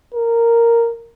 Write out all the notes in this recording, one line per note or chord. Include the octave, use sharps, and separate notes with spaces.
A#4